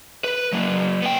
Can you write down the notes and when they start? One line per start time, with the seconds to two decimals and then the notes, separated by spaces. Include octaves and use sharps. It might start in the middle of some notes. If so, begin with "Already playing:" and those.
0.24 B4
0.53 F#3 A#3
1.02 B3 G5